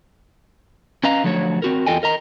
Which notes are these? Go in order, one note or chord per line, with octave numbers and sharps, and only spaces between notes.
C#4 B4 D#5 F5 A#5
D3 F3 F#3 A3 C5 C#5
C4 F#4 A#4
E2 F4 A4 D#5 G5 G#5
A#4 D#5 A#5